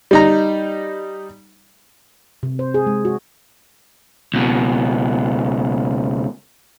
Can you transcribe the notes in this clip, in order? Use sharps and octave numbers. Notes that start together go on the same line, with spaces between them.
G3 D#4 A#5
C3
C5
G#4
G#3
F#4
C#2 B2